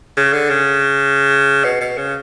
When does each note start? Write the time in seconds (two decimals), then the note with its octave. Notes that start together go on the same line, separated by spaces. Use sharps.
0.17 C#3
0.33 D3
0.49 C#3
1.64 B2
1.81 B2
1.98 C#3